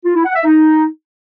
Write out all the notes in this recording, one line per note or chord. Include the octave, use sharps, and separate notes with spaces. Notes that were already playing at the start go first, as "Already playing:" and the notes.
F4
E4
F#5
E5
D#4